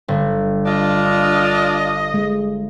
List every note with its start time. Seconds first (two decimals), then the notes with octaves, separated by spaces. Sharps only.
0.08 G1
0.66 D4 F4 D#5
2.14 G#3